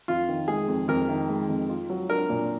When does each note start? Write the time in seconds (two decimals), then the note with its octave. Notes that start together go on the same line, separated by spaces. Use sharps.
0.08 F2 F4
0.29 D#3
0.48 G#3 G#4
0.68 F2
0.88 F2 A#4
1.08 D#3
1.29 G#3
1.49 F2
1.69 F4
1.89 F#3
2.09 D4 A#4
2.29 A#2